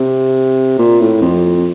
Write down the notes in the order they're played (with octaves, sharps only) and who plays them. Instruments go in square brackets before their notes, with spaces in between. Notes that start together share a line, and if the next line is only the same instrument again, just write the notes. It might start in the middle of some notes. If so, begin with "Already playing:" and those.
Already playing: [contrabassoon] C3
A#2
A2
F2